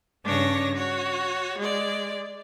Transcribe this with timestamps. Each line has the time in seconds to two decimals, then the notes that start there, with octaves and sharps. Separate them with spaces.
0.23 G2 C#3 D4 C#5 A#6
0.75 F#4 C#5
1.58 G#3 D5